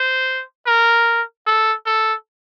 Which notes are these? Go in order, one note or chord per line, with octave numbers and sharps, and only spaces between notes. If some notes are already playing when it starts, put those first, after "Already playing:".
Already playing: C5
A#4
A4
A4